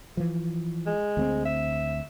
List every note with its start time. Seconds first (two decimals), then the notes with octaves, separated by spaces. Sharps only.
0.17 E3 F3
0.86 G#3
1.17 D2 A#3 C4
1.45 E5